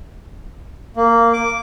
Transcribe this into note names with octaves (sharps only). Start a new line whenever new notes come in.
A#3
D6